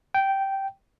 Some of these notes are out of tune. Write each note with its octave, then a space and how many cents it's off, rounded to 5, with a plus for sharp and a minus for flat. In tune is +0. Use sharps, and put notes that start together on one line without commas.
G5 -10